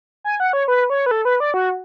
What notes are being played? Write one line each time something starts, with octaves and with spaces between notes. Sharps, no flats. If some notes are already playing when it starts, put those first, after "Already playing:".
G#5
F#5
C#5
B4
C#5
B4
A4
B4
D5
F#4